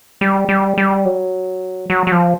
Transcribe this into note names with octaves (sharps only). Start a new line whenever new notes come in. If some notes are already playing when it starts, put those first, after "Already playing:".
G3
G3
G3
F#3
F#3
F#3
F3